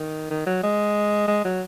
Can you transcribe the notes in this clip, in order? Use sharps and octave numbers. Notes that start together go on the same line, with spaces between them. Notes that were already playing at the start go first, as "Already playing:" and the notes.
Already playing: D#3
D#3
F#3
G#3
G#3
F#3